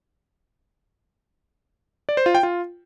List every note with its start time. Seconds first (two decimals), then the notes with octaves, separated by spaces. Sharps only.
2.09 D5
2.17 C5
2.26 F4
2.35 G5
2.43 F4